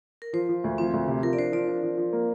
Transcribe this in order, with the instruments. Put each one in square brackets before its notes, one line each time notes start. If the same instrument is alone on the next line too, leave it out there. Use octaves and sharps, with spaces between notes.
[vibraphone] A#4
[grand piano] F3 [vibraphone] C5
[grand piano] F3
D2
[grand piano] F3 [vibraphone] C4
[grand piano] D2
C3
[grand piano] F3 [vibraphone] A#4
[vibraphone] D5
[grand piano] D4 [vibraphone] C5
[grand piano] F3 [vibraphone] D5
[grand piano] D4
F3
F3
A#3